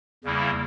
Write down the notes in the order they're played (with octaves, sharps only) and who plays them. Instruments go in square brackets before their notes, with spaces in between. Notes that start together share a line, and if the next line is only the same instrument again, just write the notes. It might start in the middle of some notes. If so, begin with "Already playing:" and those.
[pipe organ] E2 C#3 G3 A#3 E4